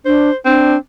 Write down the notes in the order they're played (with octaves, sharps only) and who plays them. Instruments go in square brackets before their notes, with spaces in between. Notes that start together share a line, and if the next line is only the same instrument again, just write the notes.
[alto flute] D4 [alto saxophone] C5
[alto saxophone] C4 [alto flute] D4